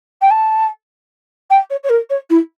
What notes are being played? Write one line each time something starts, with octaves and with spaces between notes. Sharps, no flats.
G5
A5
G5
C#5
C#5
A#4
C#5
E4